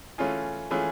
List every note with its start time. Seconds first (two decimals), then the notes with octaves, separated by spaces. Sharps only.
0.18 E3 A3 C#4 F4 G#4
0.70 E3 A3 C#4 F4 G#4